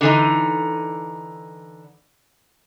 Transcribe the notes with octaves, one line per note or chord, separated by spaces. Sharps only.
D3 E3 D#4